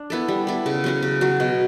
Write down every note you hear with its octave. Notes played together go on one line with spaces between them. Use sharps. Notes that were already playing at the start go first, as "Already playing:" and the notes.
Already playing: D4
B3 E4 A4
G3
B3 E4 A4
C#3
F#3 C#4 F#4
C#3
F#3 C#4 F#4
B2